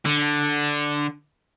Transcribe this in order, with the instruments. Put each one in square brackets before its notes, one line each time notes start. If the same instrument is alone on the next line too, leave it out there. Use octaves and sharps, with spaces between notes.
[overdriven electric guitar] D3